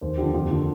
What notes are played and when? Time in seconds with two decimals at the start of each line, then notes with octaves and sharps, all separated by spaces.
0.01 D#2 C5
0.18 D3 F3 G4
0.34 F2 F4
0.50 D3 F3 A#3